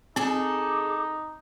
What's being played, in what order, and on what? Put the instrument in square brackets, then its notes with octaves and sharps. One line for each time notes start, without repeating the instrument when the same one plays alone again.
[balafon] C4 [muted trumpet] D#4 [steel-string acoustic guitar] G#4 A4 [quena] D6